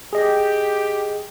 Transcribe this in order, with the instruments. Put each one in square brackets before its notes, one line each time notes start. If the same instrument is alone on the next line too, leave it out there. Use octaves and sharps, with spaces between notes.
[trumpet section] G4 [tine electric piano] G#4 D#5